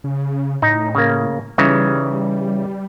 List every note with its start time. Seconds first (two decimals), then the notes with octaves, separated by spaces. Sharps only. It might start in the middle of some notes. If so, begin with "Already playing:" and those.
0.04 C#3
0.62 A2 D#4
0.95 C#3 A#3
1.58 C#3 E3 G3 D#4